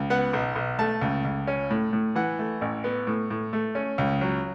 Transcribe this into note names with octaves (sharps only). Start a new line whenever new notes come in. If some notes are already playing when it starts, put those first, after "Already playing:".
Already playing: C#2
B3 F#5
B1
B1
A3 A5
C#2
C#2
C#4
A2
A2
E3 F#5
A3
A1
B3
A2
A2
A3
C#4
C#2
F#3